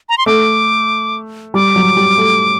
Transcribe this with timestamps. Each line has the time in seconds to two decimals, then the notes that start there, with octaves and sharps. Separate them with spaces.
0.09 A#5
0.18 C6
0.26 A3 D6
1.54 G3 D6
1.76 F#3
1.97 G3
2.18 A3